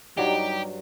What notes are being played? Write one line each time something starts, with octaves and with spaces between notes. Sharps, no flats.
G2 F#3 G3 D#4 G4